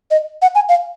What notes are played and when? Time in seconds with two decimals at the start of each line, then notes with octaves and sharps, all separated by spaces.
0.11 D#5
0.42 F#5
0.55 G#5
0.69 F5